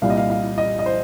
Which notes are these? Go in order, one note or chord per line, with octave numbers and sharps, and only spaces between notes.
C2 A#2 G3 F5
D#5
F5
F5
D#5
D#5
C5